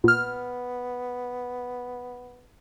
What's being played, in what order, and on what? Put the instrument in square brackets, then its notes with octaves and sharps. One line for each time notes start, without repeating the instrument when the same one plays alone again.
[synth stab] A#2 F6 [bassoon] B3